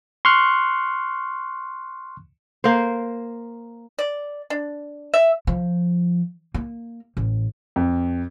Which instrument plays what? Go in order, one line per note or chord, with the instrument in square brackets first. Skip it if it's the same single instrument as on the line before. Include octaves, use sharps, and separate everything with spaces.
[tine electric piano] C6 C#6 F6 F#6
[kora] A#3 C5
[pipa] D5
D4
E5
[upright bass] F3
A#3
A1
[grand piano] F2